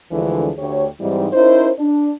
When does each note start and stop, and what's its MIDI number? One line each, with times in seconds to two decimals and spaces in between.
0.11 0.50 38
0.11 0.50 50
0.11 0.50 52
0.11 0.50 53
0.11 0.50 56
0.11 0.50 68
0.59 0.86 38
0.59 0.86 67
0.59 0.86 73
1.00 1.28 44
1.00 1.28 52
1.00 1.28 55
1.00 1.28 60
1.00 1.28 63
1.00 1.28 64
1.33 1.70 61
1.33 1.70 63
1.33 1.70 64
1.33 1.70 70
1.33 1.70 72
1.79 2.12 62